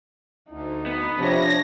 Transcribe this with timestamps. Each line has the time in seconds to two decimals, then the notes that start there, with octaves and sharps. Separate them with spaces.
0.51 D2 D#4
0.86 B3
1.18 C3 F3 D4 C#5 A#6